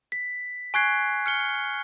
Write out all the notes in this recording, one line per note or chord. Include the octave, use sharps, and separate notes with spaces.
B6
G#5 C#6 F#6 G#6 C7
F6 C#7 G7